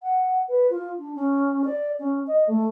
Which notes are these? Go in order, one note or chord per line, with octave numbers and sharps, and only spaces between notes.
F#5
B4
F4
D4
C#4
D5
C#4
D#5
A3